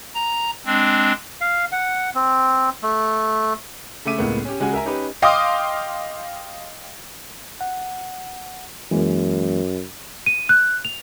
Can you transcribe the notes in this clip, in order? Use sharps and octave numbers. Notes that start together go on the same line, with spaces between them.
A#5
G#3 C4 D4
F5
F#5
C4
A3
C#3 A3 E5 D6 D#7
C#2 A2 A#3 B3
C#4 G4
C#3 G#3 F#4 G4 F#5 G#5
A#4 E5 G#5 A#5
C#4 D#4 G4 B4
D#5 F5 G5 C6 D6 D#6
F#5
F#2 E3 G#3 A#3
D#7
F#6
F7